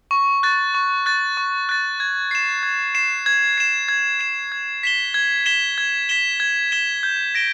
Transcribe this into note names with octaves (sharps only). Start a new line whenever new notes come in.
C#6
F#6 A6
C#6
F#6 A6
C#6
F#6 A6
G#6
C7 E7
G#6
C7 E7
G#6
C7 E7
G#6
C7 E7
G#6
B6 E7 G7
G#6
B6 E7 G7
G#6
B6 E7 G7
G#6
B6 E7 G7
G6
A#6 D7 G7